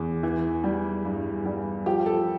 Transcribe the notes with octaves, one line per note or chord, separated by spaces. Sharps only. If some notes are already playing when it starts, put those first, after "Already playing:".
Already playing: E2
E3
G3
G2
G3
F3 G4
A4